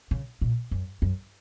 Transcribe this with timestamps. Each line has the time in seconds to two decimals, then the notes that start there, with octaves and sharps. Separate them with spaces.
0.11 C#3
0.41 A#2
0.71 F#2
1.02 F#2